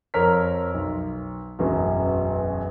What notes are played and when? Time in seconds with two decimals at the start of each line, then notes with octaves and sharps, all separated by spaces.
0.14 F2 A#4 C#5 A#5 F6 B6
0.74 B1
1.59 E1 A1 F#2 B2